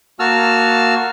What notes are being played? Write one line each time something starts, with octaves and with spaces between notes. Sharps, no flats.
A#3 F#4 A5 E6 F6